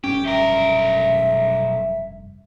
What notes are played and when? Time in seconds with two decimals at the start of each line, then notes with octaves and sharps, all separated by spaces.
0.04 F1 G2 C#4 G4
0.25 B1 A#4 E5